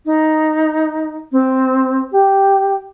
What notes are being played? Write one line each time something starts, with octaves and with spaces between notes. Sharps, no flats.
D#4
C4
G4